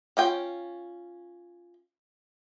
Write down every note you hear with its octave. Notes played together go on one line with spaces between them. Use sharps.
C#4 F4 G5